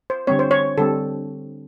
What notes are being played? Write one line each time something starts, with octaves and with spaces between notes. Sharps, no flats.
C5
D3 G3 C4 C#5
C5
C#5
D3 G3 C4 A4